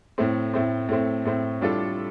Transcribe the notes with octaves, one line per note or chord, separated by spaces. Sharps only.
A2 A3 C4
A2 A3 C4
A2 A3 C4
A2 A3 C4
A2 G3 D4 F4 A4